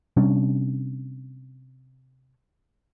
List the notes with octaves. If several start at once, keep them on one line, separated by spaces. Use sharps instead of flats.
C3 G3 C#4 D4